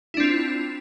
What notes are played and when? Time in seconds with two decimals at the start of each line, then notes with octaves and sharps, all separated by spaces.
0.14 E4
0.17 D4
0.20 C4
0.23 F4